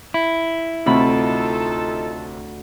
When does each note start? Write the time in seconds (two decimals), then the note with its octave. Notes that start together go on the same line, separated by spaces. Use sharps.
0.14 E4
0.86 D2 C3 D#4 F4 A4 B5